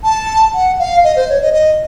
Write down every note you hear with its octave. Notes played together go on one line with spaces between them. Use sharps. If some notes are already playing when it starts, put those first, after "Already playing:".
A5
F#5
F5
D#5
C5
C#5
D#5
D#5